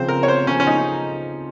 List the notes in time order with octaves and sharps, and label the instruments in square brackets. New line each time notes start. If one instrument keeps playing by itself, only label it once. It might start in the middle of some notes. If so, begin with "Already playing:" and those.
Already playing: [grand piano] C#3 F3 C4 [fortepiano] C5
[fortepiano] A#4
C#5
C5
[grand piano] C#3 F3 C4 [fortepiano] C#4
[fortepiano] C#4
D#4